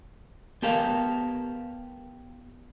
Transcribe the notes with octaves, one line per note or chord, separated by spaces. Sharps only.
B3 G4 A4 A#4 F5